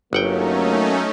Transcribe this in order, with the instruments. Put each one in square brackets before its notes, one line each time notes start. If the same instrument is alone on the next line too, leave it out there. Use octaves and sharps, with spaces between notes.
[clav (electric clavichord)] G1 F#5 G5 [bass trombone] F#3 [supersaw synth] A3 C#4 D#4 [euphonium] A#3